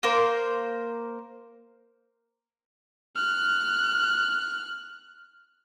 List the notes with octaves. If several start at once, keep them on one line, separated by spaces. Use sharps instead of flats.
A#3 A#4 C5
F6 F#6